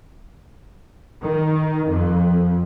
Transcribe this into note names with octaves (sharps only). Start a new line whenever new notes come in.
D#3
F2